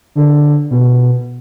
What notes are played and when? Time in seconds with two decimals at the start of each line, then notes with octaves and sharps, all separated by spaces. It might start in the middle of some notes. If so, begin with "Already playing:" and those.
0.15 D3
0.71 B2